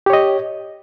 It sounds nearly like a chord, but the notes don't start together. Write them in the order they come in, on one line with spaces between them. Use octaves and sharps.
G4 C#5 D#5